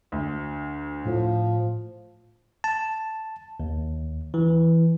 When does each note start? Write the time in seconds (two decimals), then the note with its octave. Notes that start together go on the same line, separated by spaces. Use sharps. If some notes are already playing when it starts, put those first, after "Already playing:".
0.12 D2
1.05 A2 F3
2.64 A5
3.60 D#2
4.34 E3